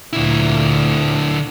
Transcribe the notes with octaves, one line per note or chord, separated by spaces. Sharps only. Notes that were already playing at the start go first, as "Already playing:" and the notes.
D2 A#2 D3 E4